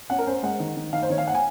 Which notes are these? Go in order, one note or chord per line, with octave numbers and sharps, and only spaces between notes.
C#4 F#5
A#4
C#4 C5
G#3 F#5
D#3
D#3
D#3 F5
C5
D#3 C#5
F5
F#5
G#5